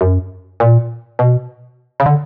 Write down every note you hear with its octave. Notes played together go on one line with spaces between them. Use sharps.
F#2
A#2
B2
C#3
D3